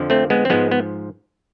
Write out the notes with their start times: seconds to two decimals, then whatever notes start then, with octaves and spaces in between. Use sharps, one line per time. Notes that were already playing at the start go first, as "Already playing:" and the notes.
Already playing: F2 D3 F3
0.10 A3 C4
0.30 G#3 B3
0.45 C4
0.50 G#2 F3 G#3 B3
0.71 B3